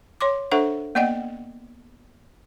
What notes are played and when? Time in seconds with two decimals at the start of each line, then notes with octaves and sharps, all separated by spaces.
0.21 C#5 C6 D6
0.51 D4 A4 C5 E5 F#5 C#6
0.95 A#3 B3 D5 D#5 F#5 G5